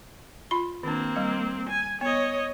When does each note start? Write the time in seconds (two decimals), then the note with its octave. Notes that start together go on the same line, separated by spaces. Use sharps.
0.51 F4 B5
0.83 D#3 A#3 C4 D4
1.16 G3 F5
1.69 G#5
2.01 B3 C#5 D#5